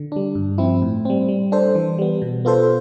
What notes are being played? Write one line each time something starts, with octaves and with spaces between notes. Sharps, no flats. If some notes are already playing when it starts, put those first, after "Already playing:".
Already playing: D3
G3 D4
G2
F3 C4 E4
A2
G3 C4
G3
D4 A4 C5
E3
G3 B3
B2
B3 F4 A4 C5